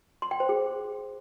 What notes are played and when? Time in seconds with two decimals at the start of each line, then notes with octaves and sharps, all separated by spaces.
0.22 C6
0.31 G5
0.40 C5
0.49 G#4